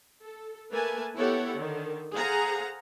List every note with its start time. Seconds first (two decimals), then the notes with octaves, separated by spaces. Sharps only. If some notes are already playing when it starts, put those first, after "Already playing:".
0.22 A4
0.71 A3 A#3 A#4 B4 G#5 A5
1.15 B3 E4 G4 A4 C#5 F#5
1.56 D3 D#3
2.12 G#4 A4 C5 F5 F#5 A#5